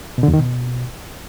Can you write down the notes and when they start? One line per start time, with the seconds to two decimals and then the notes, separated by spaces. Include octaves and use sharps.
0.18 B2
0.23 D3
0.28 E2
0.34 D#3
0.39 B2